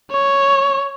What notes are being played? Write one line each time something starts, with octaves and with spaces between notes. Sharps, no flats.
C#5